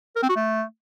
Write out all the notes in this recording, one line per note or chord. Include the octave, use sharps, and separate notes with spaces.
A#4
C4
F#4
A3